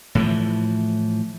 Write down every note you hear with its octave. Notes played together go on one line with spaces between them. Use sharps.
A2 E3 F3